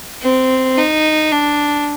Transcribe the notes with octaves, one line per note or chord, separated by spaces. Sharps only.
C4
D#4
D4